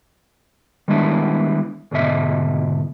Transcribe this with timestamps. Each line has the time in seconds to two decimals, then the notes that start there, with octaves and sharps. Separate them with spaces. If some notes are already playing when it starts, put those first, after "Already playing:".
0.88 D#3 G3 G#3 B3 D4 E4
1.91 D2 G#2 B2 D#5 E5